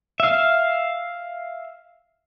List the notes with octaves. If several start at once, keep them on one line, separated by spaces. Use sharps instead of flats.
E5 F5